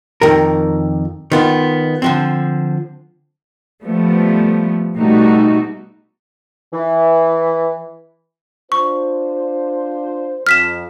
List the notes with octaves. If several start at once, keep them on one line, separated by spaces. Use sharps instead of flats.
F2 D#3 A#4
D#3 B3 F4
D3 F3 C4
F3 G3 A3 B3
B2 G3 A3 D#4 F#4
E3
D4 F4 C5 C#6
F2 F6 B6 E7